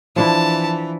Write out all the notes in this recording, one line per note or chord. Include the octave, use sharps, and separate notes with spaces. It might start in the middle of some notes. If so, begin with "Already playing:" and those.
E3 F3 D4 E4 A5